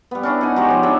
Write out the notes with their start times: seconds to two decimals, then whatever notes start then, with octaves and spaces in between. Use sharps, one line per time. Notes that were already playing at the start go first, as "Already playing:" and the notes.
0.11 G3 B3
0.23 C#4 D4 E4
0.41 D#4 F#5 G#5
0.56 F#3 G#3 F#4 G4
0.70 F3
0.83 D4 G#4 C#5 E5